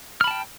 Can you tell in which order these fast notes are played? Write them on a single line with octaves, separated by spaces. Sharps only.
F6 B5 A5 G5